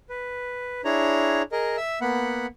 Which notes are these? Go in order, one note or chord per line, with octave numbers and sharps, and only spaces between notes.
B4
D4 E4 G#4 C#5 A#5
G#4 A#4 D#5
E5 E6
A#3 B3 F#5 B5